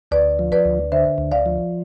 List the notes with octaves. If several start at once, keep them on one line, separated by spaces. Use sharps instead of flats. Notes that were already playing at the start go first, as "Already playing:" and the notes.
D2 B4 D5
F3
B4 D5
D2
D3 C5 E5
D2
D5 F5
F3